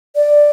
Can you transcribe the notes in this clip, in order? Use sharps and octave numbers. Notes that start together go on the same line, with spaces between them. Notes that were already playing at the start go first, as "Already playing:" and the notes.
D5